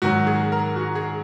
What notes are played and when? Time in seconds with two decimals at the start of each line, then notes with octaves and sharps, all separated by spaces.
0.02 G#2 D#3 F#3 F#4
0.27 G#4
0.52 A#4
0.76 F#4
0.95 G#4